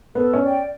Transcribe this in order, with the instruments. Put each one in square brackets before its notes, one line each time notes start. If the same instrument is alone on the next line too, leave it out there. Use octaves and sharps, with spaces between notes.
[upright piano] B3 [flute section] A4
[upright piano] C#4
[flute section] D5 G5